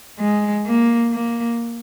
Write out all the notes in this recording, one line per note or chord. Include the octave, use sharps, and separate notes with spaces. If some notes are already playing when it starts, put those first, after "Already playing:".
G#3
A#3
A#3